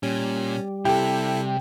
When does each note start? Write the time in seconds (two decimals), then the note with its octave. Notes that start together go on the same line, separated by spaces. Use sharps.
0.03 A#2 G3 C#4
0.85 C3 E4 G4 A4